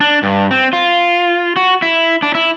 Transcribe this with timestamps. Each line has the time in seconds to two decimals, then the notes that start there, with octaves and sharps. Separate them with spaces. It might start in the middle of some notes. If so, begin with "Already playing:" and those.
0.01 D4
0.23 G2
0.51 C4
0.73 F4
1.56 F#4
1.82 E4
2.22 D4
2.35 E4